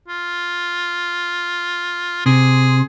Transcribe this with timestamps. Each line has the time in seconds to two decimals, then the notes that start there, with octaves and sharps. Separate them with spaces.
0.09 F4
2.26 C3 G#4